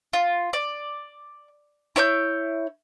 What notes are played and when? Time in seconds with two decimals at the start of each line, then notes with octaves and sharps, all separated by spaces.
0.13 F4
0.53 D5
1.96 E4 C#5 D6 G6